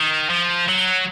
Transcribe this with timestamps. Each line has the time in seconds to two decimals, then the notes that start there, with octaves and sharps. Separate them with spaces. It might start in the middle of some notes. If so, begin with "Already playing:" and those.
Already playing: D#3
0.30 F3
0.69 F#3